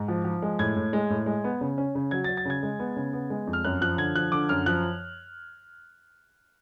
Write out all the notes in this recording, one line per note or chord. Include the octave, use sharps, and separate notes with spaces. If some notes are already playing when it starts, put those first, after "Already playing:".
Already playing: G#2
F3
F3
G#3
A2 G#6
A2
G#3
A2
G#3
B3
C#3
C#4
C#3
F#3 G#6
A6
F#3
A6
C#3 G#6
G#3
B3
C#3
B3
G#3
F2
F6
F#2 F#6
F3 F#6
D3 G#6
F3 F#6
D3 D6
F#2 F6
F3 F#6